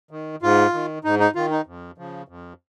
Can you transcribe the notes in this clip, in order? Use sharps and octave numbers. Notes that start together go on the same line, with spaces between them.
D#3
G#2 F4
D#3
G#2 D#4
D#4
D#3 F4
D#4
F2
C#3 F3
F2